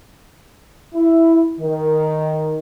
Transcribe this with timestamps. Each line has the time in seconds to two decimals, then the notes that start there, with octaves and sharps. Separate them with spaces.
0.95 E4
1.60 D#3